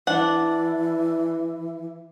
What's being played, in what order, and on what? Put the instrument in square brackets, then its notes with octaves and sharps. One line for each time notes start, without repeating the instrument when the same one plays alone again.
[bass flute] E3 [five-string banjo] D4 F#5